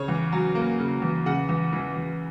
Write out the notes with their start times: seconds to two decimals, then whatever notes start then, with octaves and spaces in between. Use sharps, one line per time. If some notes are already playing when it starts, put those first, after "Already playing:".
Already playing: C#3 C#5
0.08 E2
0.32 F#3
0.55 A#3
0.79 C#3
1.02 E2
1.26 C#3 F#5
1.49 E2
1.73 E3
1.96 E2